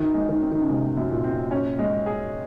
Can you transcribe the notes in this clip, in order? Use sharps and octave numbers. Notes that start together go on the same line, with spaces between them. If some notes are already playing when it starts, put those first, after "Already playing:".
Already playing: F#2 D#3
G#3
D#3
C4
D#3
C#3
C3 G#3
F#2
A#2
C4
C#4
G#3
G#4